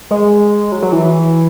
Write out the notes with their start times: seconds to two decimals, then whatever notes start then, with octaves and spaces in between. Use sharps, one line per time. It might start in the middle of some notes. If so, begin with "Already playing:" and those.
0.11 G#3
0.72 F#3
0.82 F#3
0.92 E3